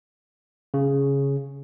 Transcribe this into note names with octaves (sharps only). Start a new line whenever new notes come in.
C#3